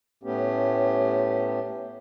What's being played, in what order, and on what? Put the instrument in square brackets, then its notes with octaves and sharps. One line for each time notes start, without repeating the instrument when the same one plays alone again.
[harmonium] A2 A3 B3 C#4 G4